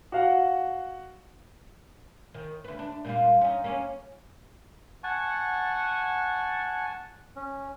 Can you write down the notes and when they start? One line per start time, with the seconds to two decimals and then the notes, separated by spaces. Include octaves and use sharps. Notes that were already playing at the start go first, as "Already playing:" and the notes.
0.12 F#4 F5 F#5
2.34 D#3
2.64 D2 B4
2.79 D4
3.05 A#2 G3 F4
3.41 C#4 D#4
3.64 A#3 C#4
5.04 F#5 G#5 A5 C#6
7.36 C#4